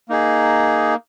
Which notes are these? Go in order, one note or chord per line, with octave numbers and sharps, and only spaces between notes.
A#3 D#4 G#4